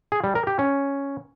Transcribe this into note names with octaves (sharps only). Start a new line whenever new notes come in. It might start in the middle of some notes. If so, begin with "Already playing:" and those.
G#4
G3
A#4
G4
C#4